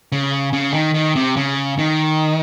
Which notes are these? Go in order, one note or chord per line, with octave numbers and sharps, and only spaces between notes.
C#3
C#3
D#3
D#3
C3
C#3
D#3